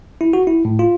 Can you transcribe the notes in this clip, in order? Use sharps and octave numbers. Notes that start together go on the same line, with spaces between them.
E4
F#4
E4
A2
F4